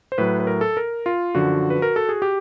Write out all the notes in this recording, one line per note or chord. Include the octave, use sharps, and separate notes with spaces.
C5
A2 F#3 B4
B4
A#4
A4
A#4
F4
F#2 D3 F3 F#4
B4
A#4
A4
G#4
G4